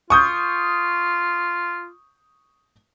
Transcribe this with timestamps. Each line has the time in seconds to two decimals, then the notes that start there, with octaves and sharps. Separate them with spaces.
0.10 F4 C#6 D#6 G6